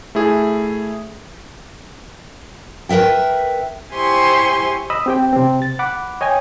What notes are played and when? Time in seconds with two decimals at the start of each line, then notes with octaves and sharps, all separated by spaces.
0.15 A3 E4 G#4
2.89 A#4 B4 E5 G5
3.93 E4 G4 C5 G#5 C6 C#6
4.90 D#5 B5 D#6 E6
5.06 C4 G4 G5
5.33 C3 C4
5.62 A6
5.79 F#5 B5 D6
6.21 C#5 D#5 G5 G#5